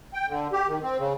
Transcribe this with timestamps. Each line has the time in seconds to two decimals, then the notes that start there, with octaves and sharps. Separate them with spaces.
0.14 G5
0.28 D3
0.52 G4
0.68 D#3
0.83 C4
0.99 C#3